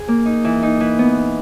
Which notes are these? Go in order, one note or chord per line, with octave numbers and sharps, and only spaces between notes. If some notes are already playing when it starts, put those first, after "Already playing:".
Already playing: G#4
A#3
D#4
E3
D#4
E3
B3